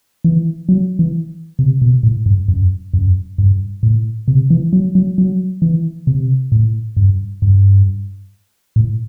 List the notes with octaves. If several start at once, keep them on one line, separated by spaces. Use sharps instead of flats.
E3
F#3
E3
C3
B2
A2
G2
F#2
F#2
G2
A2
C3
E3
F#3
F#3
F#3
E3
C3
A2
G2
G2
A2